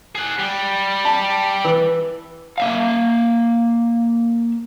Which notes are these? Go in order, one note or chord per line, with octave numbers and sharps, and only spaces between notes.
G#4 F#5
G3
A5
E3
A#3 E5 F5